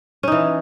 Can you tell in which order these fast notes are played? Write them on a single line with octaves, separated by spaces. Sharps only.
C#4 D#4 E3